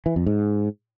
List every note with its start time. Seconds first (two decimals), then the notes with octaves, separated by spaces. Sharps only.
0.06 E3
0.16 F2
0.26 G#2